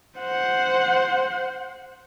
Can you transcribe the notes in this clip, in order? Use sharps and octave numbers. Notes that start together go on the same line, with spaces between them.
C5 F#5